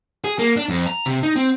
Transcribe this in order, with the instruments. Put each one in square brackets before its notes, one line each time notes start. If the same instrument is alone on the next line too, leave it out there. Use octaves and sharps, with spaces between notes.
[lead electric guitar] G#4
A#3
D4
F2
A#5
C3
D#4
C4